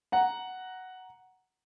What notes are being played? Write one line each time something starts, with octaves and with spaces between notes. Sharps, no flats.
F#5 A#5